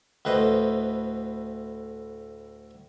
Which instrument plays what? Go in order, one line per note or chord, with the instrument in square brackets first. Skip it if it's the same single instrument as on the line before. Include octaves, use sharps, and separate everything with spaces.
[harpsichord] D2 A2 B4 C5 D#5